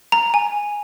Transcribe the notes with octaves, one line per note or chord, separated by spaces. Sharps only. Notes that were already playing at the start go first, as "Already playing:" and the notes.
A#5
G#5